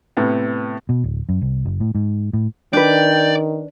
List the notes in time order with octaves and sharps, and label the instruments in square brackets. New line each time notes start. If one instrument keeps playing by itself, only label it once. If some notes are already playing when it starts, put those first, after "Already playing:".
[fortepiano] A2 C3 B3
[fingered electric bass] B2
D1
F#2
C2
F#1
A2
G#2
A2
[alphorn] D#3 [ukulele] D4 B4 [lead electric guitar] D5 [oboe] G5